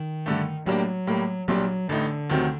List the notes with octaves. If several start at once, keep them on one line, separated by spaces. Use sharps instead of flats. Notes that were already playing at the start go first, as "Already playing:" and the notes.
Already playing: D#3
G2 D3 A3
A2 F#3 G3 A#3 D4
A2 G3 A#3
A#1 A#2 F#3 G3 D4
A1 A2 D3 A3 D#4
D2 C3 D#3 F#3 C4